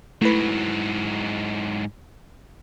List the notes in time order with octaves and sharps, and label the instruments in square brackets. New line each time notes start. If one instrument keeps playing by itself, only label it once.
[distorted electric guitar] G#2 F#3 [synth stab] A3 B4 [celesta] E4